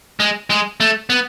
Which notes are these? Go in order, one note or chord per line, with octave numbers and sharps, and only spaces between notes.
G#3
G#3
A3
B3